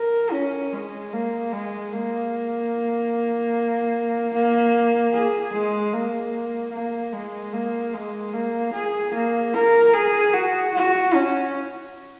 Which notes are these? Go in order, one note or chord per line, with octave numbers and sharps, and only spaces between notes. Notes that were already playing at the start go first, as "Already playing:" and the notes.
Already playing: A#4
C#4
G#3
A#3
G#3
A#3
A#3
G#4
G#3
A#3
A#3
G#3
A#3
G#3
A#3
G#4
A#3
A#4
G#4
F#4
F#4
C#4